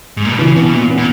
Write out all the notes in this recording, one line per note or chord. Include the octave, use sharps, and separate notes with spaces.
G#2
A#2
B2
C#3 E3
B2 B3
B2
A#2 E3
B3
A#2